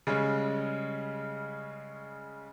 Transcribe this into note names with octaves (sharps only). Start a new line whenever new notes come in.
C#3 G3 G#3 C#4